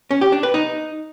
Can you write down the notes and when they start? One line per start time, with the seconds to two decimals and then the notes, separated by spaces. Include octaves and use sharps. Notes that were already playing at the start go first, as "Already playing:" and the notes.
0.11 C#4
0.21 G4
0.32 D4
0.43 B4
0.54 D#4